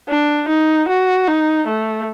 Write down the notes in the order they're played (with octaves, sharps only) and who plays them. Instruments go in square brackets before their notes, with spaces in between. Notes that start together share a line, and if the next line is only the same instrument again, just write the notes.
[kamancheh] D4
D#4
F#4
D#4
A3